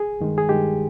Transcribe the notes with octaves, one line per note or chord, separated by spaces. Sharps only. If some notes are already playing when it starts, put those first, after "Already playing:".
Already playing: G#4
G2 D#3 G#3
G#4
G2 D#3 G#3 G4